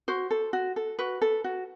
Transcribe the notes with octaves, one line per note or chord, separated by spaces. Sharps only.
F#4 C5
A4
F#4
A4
F#4 B4
A4
F#4